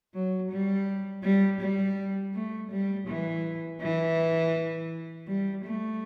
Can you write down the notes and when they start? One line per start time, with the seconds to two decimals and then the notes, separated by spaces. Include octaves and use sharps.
0.14 F#3
0.51 G3
1.24 G3
1.61 G3
2.34 A3
2.71 G3
3.08 E3
3.82 E3
5.28 G3
5.65 A3